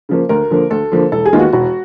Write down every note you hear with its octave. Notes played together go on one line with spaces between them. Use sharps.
C#3 F3 A#3
D2 A#4
D3 F3 A#3
D2 A4
D3 F3 A#3
E1 A4
G#4
D#2 D#3 G#3 B3 F4
F#4
E1 F#4